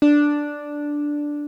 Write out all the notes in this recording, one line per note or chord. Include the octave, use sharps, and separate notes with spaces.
D4